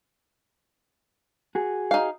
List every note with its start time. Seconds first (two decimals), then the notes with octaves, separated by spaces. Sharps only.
1.55 F#4 G#4
1.91 D#4 F5